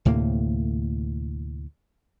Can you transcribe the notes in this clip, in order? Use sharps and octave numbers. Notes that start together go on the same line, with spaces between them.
D2 A2 C3 A#3